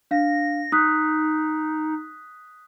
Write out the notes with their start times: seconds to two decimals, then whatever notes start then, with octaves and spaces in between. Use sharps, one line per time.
0.11 D4 F5 A#6
0.72 D#4 D#6 F#6 B6